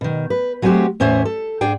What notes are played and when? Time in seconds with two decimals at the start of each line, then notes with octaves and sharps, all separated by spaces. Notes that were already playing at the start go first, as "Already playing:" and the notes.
0.01 B2 D#3
0.30 B4
0.62 F#3 G#3 A3 C4 F#4 G4
1.00 E2 A2 C#4 C5 E5
1.25 A4
1.61 G#2 D4 G#4 G5